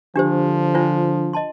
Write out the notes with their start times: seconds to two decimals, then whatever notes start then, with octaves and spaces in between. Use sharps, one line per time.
0.16 D3 F3 D4 G4 C5
0.74 D4 F4 C5
1.33 D#5 A5 C6